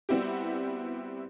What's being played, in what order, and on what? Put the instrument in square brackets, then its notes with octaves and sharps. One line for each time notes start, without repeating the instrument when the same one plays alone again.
[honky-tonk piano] G3 B3 C4 E4 F#4 G4